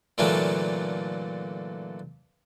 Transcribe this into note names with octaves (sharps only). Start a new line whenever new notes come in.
A#2 D3 E3 F#3 A3 A#3